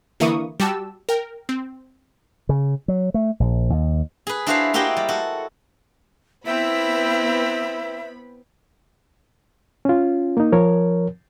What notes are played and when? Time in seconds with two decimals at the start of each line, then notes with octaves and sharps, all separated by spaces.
0.20 D3 E3 A#3 E4 C#6 D#6
0.60 G3 F#4 G4 A5 E6
1.09 A#4 G5
1.49 C4
2.49 C#3
2.88 F#3
3.14 A3
3.40 A#1
3.70 D#2
4.27 G#4 B4
4.47 D4 E4 F#4 B4 C5 F5
4.74 A#3 E4 F#4 G4 D#5 G5
4.97 G3
5.09 F#4 A4
6.46 B3 C4 E4 E5 G5 B5
9.85 C#4 F4
10.37 A#3 D#4
10.52 F3 A#4 C#5